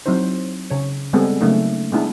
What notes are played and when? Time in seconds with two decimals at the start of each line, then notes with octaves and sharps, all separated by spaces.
0.06 F#3 C4 D#4 E4 C5
0.71 C#3 C#5
1.13 G3 G#3 B3 C4 G#4 A4
1.41 C#3 F#3 A3 A#3 C#4 D#4
1.92 G#3 B3 D4 E4